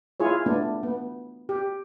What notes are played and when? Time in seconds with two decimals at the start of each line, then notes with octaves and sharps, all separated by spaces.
0.20 E4 F4 G#4 C#5
0.46 A3 B3 D4
0.83 B3
1.49 G4